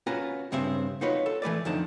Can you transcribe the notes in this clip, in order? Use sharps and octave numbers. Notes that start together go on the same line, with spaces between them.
C#4 F4 F#4 B4 A#5
G2 C#3 C4 C5 E5
D#4 F4 F#4 B4 C#5
A4
E3 A3 B4 D5
F2 D3 D#4 A5